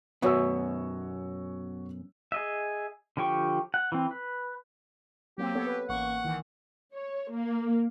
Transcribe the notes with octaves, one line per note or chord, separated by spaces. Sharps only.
F#2 B2 B3 F#4 C#5 E6
G#4 D#5 E5
D3 F3 G4 G5 C#6
F#5
E3 C4
B4
F#3 A#3 C4 G4
B3 A4 C#5
B4
A1 A#3 F#5 C#6
D#3 E3
C#5
A#3